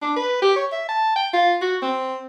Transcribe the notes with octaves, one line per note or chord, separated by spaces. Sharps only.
D4
B4
G4
C#5
E5
A5
G5
F4
F#4
C4